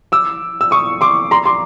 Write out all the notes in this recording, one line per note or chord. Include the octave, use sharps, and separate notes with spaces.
D6 E6
E6
C#6 D#6
C6 D6
A#5 C6
C6 D6